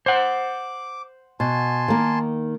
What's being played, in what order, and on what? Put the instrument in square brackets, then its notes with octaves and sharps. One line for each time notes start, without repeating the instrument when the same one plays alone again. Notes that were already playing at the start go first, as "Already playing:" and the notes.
[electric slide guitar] C5 F#5 [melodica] D6
[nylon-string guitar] B2 [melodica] G#5 A5 C6
[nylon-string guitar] D#3 A#3